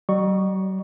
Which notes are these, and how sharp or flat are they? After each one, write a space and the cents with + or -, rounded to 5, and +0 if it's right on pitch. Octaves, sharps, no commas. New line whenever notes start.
F#3 +45 D#5 -45 C#6 +0